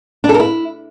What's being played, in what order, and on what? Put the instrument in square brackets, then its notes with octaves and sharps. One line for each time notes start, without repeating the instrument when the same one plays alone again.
[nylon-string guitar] D4
A4
A#4
E4